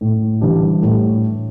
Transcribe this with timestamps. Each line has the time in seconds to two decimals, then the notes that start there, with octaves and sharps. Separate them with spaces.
0.01 A2
0.41 E3 G3 D4 G4
0.82 A2